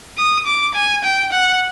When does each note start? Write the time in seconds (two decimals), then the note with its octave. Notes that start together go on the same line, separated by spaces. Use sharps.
0.18 D#6
0.47 D6
0.75 G#5
1.04 G5
1.32 F#5